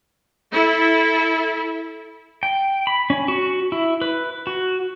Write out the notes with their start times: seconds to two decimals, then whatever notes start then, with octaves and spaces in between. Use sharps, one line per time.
0.51 E4 A4
2.43 G5
2.87 B5
3.10 C#4
3.28 F#4
3.72 E4
4.01 B4
4.47 F#4